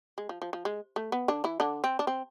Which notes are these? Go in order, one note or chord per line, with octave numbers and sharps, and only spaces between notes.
G#3
F3
F3
F3
G#3
A3
B3
D3 D4
E3 E4
D3 D4
C4
D4
C4